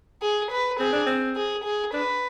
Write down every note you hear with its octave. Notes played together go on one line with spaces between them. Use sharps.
G#4
B4
C4 G#4
D4
C4
G#4
G#4
D4 B4